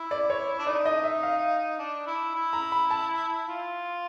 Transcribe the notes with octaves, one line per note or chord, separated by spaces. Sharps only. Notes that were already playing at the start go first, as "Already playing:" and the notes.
Already playing: E4
D5
C#5
D4
D#4 D5
D#5
E5
F5
D4
E4
E4
A#5
B5
A5
F4